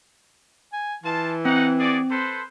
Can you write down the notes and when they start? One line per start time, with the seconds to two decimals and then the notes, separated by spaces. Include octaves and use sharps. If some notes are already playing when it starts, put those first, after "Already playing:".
0.73 G#5
1.04 E3 F4 A5
1.45 C4 D#4 F#5
1.79 F#4 G#4 D5
2.11 A4 B4 C5